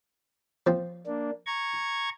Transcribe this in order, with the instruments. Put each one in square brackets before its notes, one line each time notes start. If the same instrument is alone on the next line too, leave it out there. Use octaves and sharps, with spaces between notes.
[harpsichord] F3 C4
[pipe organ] A#3 D4
A#5 C#6 G#6